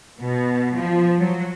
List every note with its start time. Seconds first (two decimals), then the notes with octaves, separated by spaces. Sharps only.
0.19 B2
0.75 F3
1.18 F#3